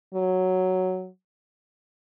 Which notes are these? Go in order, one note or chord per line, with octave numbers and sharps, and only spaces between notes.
F#3